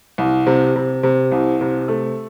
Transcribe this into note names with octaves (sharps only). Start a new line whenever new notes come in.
C2
C3
C3
C3
C2
C3
A3